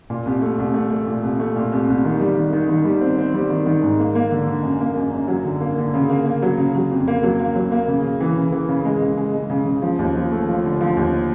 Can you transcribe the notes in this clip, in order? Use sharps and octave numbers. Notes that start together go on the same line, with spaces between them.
A#2
C2
A3
C2
A3
A3
A#2
C2
A3
A#2
C2
C2
D#3
G3
D#3
D#3
D#3
G3
C4
C4
G3
D#3
D#3
G#2
A#3
A#3
D3
D3
F#2
A#3
F#2
F#2
F#3
D3
A#3
D3
C#3
A#3
A#3
F#3
C#3
F#3
F2
A#3
F#3
A#3
F#3
A#3
C#3
C#3
E3
C#3
E3
C#3
G#3
C#3
G#3
G#3
C#3
C#3
F3
D#2
F3
A3
F3
D3
F3
D#2